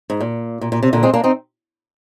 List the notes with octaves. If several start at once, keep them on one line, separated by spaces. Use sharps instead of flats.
G#2
A#2
A#2
A#2
C3
A#2 D3
G#3 C4
A#3 D4
C4 D#4